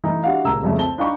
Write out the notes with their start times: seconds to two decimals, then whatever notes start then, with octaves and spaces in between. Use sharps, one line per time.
0.04 E3 A3 D#4
0.23 D4 E4 F#4 G4 F5 F#5
0.44 D#1 C#2 A#3 A#5 E6
0.63 F1 C2 F2 C#3 A3
0.78 C4 A5 G7
0.98 D4 D#4 F5 G5 B5 C#6